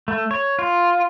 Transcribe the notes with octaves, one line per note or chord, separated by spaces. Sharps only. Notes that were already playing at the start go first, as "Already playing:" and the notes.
A3
C#5
F4